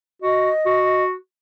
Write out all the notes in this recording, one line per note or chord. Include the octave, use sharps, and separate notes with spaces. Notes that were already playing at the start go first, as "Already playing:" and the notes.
F#4 D#5
F#4